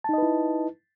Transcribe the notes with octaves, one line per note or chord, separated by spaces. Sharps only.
D#4 E4 B4 D#5 A5